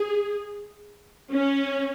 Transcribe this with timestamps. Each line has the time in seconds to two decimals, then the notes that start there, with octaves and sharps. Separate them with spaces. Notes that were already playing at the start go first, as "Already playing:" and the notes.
Already playing: G#4
1.31 C#4